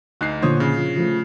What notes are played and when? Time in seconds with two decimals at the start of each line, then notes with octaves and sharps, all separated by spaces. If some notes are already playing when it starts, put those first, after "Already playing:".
0.21 D2 D#4 F#6 C7
0.42 A#2 D3 F3 C5 C#5 D#6
0.60 C#3
0.76 F4
0.97 F3 A3 F4